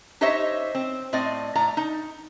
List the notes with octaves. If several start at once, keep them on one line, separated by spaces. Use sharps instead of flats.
D#4 G4 C5 C#5 D#5 E5
C4
A2 C4 D5 D#5
A2 D5 A#5
D#4